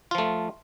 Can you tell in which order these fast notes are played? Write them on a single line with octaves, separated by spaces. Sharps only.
F4 F3 A3